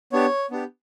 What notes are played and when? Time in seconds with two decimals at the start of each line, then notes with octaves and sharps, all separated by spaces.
0.12 B3 D4 G4 C#5
0.51 B3 D4 G4